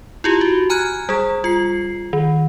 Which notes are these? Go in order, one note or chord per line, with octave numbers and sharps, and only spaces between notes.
E4 F4 G4
F#4
G#5 A#5 F6 F#6 G#6
G3 G#4
F4 C7
D#3